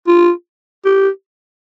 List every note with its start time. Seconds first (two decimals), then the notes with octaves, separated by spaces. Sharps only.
0.07 F4
0.85 G4